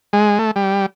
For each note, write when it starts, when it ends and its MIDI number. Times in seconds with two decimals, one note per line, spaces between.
0.13 0.38 56
0.39 0.51 57
0.56 0.86 55